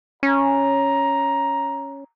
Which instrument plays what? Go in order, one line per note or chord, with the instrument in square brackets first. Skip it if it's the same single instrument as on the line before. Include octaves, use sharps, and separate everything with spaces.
[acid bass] C#4 [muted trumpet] A#5